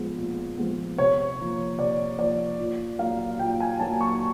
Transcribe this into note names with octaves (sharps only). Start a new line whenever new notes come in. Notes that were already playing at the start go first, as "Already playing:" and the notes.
Already playing: A#2 F3 G#3 B3
A#2
F3 G#3 B3
C3 C#5
F3 A#3
C3 D5
F3 A#3 D5
A#2
F#3 A#3 F5
A#2 G5
G#5
F#3 A#3 A5
C#6